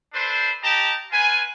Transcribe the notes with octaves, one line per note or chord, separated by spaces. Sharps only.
D4 A4 B4 C5
G4 D#5 G5 A5 A#5
F4 B4 G#5